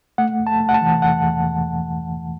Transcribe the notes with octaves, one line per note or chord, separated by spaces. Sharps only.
A3 F#5
E2
A5
A3
F#5
A5
E3
E2 F#5
E2
E2